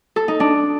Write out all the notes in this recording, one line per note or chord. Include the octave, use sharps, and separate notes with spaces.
A4
D#4
D4